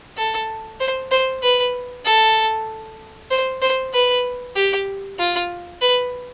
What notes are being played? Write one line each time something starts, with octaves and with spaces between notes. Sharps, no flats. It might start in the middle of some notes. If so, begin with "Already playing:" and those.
A4
C5
C5
B4
A4
C5
C5
B4
G4
F4
B4